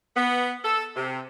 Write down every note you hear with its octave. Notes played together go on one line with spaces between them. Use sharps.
B3
A4
C3